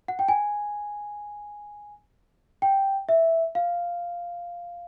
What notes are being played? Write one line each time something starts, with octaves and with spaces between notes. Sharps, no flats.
F#5
G5
G#5
G5
E5
F5